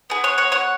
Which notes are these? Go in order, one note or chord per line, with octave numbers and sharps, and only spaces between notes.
B3 G#4
C#5 F#5
C#5 F#5
C#5 F#5